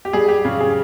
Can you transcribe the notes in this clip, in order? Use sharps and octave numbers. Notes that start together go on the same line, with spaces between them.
G4
G3 G#4
G4
C#3
G#4